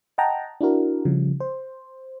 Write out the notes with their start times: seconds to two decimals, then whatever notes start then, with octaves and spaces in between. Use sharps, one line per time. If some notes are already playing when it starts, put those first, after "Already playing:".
0.18 D#5 F#5 G5 A5 A#5
0.61 D4 E4 F#4 A#4
1.05 C#3 F3 G3
1.40 C5